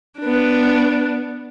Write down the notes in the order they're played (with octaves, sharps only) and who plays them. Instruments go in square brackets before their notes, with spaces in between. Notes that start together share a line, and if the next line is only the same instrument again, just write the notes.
[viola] B3 D4